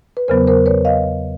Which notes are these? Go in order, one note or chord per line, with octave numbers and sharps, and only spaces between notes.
B4
E2 C#3 F#3 B3 A#4 C5
A#4 C5
B4 C#5
D#5 F5